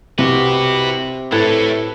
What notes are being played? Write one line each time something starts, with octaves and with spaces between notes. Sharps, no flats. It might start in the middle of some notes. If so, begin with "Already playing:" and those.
C2 C3 F#4 B4
A2 E4 A4 B4 C#5